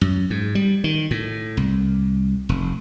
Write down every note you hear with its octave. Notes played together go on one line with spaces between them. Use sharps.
F#2
G#2
G3
D#3
A2
C2
F1